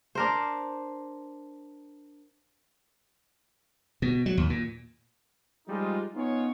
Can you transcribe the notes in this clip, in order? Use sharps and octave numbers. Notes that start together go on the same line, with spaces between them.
D4 A#4 C5
B2
F#3
D#2
A#2
F3 G3 G#3 D#4 F4
B3 C#4 D#4 F4 C#5